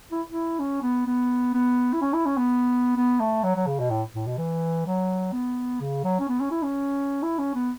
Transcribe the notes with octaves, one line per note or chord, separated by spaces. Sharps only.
E4
E4
C#4
B3
B3
B3
E4
C#4
E4
C#4
B3
B3
A3
F#3
F#3
C#3
B2
A2
A2
B2
E3
F#3
B3
C#3
F#3
C#4
B3
C#4
E4
C#4
E4
C#4
B3